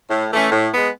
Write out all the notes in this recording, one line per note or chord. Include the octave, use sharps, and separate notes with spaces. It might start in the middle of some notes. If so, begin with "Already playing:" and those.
A2
E3 A3 C#4
A2
G#3 B3